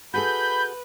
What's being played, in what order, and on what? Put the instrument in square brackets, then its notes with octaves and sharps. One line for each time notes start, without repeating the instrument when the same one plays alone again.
[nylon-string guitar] F#4 G#4 A4 [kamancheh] B4 [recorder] B5 [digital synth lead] G6